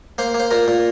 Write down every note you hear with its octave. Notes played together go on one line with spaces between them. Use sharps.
A#3 C5
A#3
C5
A#2 A#4
A#2